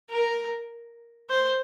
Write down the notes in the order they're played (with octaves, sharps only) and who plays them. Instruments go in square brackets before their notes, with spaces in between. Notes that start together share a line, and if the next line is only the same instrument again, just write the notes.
[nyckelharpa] A#4
C5